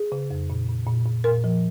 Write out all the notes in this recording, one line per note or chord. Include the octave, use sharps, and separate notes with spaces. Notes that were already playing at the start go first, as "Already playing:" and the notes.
Already playing: G#4
C#3
F2
A#2
A#2
A#2
A#2
A#2 A#4
F3